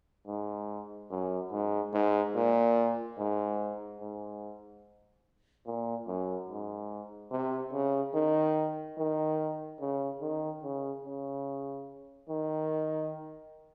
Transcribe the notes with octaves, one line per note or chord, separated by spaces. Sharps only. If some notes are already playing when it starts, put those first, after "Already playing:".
G#2
F#2
G#2
G#2
A#2
G#2
G#2
A#2
F#2
G#2
C3
C#3
D#3
D#3
C#3
D#3
C#3
C#3
D#3